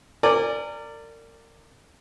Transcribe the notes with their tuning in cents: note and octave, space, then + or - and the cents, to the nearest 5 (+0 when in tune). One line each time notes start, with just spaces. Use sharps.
A#4 -35 D5 +0 G#5 -20